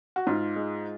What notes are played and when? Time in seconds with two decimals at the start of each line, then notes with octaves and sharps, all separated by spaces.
0.16 F#4
0.27 G#2 F4
0.56 G#3